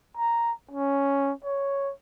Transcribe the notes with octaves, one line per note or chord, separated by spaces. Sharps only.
A#5
C#4
C#5